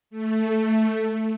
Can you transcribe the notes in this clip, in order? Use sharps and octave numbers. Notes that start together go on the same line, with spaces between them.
A3